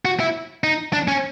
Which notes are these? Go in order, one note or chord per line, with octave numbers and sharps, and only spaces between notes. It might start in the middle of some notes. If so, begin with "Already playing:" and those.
F#4
E4
D#4
D4
C#4